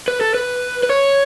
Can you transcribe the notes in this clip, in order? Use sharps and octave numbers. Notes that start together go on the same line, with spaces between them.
B4
A4
B4
B4
C#5